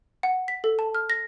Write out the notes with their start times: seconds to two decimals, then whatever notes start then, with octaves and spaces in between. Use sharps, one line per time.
0.23 F#5
0.48 B6
0.64 A4
0.79 A5
0.95 F6
1.10 A#6